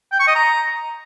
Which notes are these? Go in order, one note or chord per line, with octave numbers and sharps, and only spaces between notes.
G5
C#6
D#5
A#5